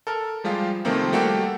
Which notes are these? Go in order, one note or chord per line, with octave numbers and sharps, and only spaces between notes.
A4 A#4 F6
F3 G3 G#3 F4 G4
C3 D#3 F3 A3 A#3 C4
G3 A3 A#3 F#4 G4